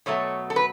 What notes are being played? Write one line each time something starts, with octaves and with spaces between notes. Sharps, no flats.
B2 F#3 A3 C#5
A4
B4